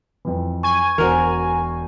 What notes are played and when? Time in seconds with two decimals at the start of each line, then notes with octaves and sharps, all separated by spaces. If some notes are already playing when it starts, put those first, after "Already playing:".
0.25 F2 E3
0.63 G#5 C#6
0.98 E1 F#4 A#4 C5